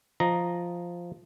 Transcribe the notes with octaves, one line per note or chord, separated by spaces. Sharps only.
F3 D#5 A#5